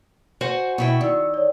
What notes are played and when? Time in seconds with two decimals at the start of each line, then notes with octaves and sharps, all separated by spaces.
0.41 F#4 C5 F#5 G#5
0.78 B2 E4 G5
1.01 D#3 D5 E6
1.34 C#5 D5